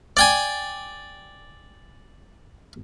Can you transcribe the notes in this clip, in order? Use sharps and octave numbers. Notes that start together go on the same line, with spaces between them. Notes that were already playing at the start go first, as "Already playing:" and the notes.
D5 G5 G#5